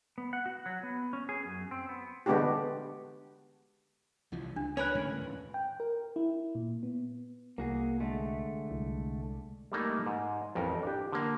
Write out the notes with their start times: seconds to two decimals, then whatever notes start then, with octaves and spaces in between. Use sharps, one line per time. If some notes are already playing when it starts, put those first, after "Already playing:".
0.18 B3
0.33 F#5
0.46 F#4
0.66 F#3
0.83 B3
1.13 C#4
1.29 G#4
1.45 F#2
1.71 C4
1.89 B3
2.26 D3 G#3 B3 D4 F#4 G4
4.32 C2 E3 F3
4.56 C#2 D4
4.77 C#4 A#4 B4 C#5 B5 F#6
4.95 A2 D3 G#3
5.21 D#2 A2
5.54 G5
5.80 A#4
6.16 E4
6.55 A#2
6.83 B3
7.58 C2 A#3 F#4 G#4
8.00 D3 G#3 A3
8.71 C2
9.72 G3 A3 A#3 D#4
10.06 G#2
10.55 A1 F2 A#4
10.83 D4 G4
11.12 D3 A#3